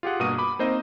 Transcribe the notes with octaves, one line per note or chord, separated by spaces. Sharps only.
F4 G4 G#4 F#5
G2 B2 A#3 F#4 D#6 D#7
B5 D6
A#3 C4 D#4 C5 D#5